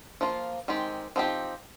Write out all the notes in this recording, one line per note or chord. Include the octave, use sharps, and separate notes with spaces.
F3 A#3 F4
D#3 G#3 C4 G4
F3 C4 D#4 G4